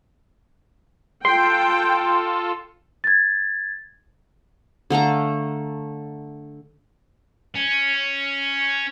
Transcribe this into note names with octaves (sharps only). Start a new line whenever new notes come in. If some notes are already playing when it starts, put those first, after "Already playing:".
F4 A4 G5 C6
G#6 A6
D3 A3 F5 A#5
C#4